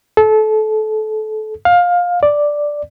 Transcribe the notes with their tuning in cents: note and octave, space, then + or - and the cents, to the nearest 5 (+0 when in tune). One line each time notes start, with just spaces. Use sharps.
A4 -25
F5 +20
D5 +0